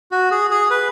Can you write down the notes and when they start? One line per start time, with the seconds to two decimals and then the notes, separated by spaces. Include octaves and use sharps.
0.12 F#4
0.31 G#4
0.51 G#4
0.70 B4